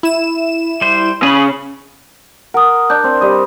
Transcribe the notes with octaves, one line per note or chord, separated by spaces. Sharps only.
E4 E7
G3 C5
C#3 G#4 B5
A#4 F#5 D#6
D4 G6
C4
G3 D#5